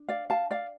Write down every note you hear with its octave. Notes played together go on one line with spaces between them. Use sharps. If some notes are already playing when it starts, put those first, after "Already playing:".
Already playing: D4
D5 F5
F5 A5
D5 F5